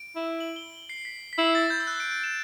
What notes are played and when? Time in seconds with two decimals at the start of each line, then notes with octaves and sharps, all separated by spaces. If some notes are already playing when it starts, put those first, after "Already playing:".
Already playing: D7
0.16 E4
0.40 F#7
0.56 G7
0.89 C7
1.05 B6
1.33 B6
1.38 E4 C7
1.55 A6
1.70 G6
1.80 E6
1.87 F#6
2.00 D7
2.11 D7
2.24 E7